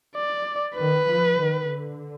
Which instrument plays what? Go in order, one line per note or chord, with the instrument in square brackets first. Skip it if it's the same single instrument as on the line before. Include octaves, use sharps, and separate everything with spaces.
[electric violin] D5
[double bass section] D#3 [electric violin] B4
[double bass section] F3
D#3
D3